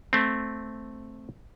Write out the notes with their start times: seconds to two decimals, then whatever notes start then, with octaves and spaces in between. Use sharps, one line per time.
0.13 A3 C4